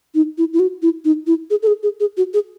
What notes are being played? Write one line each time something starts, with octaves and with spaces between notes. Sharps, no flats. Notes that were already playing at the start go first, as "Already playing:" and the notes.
D#4
E4
E4
F#4
E4
D#4
E4
G#4
A4
G#4
G#4
G#4
F#4
G#4